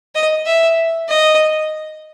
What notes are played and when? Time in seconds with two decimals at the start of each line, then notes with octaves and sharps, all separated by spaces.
0.15 D#5
0.46 E5
1.08 D#5